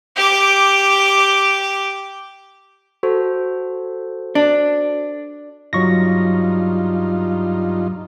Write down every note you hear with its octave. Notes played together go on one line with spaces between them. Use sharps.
G4 D6
F#4 A4 C5
D4
G2 F#3 D#4 F4 C#6 A#6